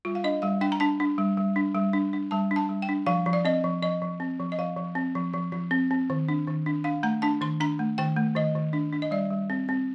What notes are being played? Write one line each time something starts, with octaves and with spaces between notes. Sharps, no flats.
G3 F4
F5
D4 D#5
G3 F5
D4 G5
A#5
D4 A5
D4
G3
G3
D4
G3
D4
D4
G3 A5
D4
A5
G3
G5
D4
F3 F5
F3
D5
C4 D#5
F3
F3 D#5
F3
C4
F3
D#5
F3 F5
F3
C4
F3
F3
F3
C4
C4
D#3
D4
D#3
D4
D4 F5
A3 A#5
D4 A5
D#3 C6
D4 A#5
A3
D#3 G5
A3
D#3 D#5
D#3
D4
D4
D#5
G3 D5
G3
C4
C4